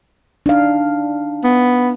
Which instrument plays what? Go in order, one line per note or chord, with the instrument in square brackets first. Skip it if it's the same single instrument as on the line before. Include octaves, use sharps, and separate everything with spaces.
[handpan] D4 D#4 F5
[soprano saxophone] B3